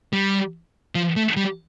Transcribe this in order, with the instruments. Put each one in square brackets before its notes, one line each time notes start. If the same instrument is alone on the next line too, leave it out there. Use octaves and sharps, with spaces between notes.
[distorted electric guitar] G3
F3
A3
G3